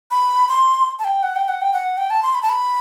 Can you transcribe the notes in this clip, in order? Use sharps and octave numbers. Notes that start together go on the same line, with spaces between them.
B5
C6
A5
G5
F#5
G5
F#5
G5
F#5
G5
A5
C6
B5
A5
B5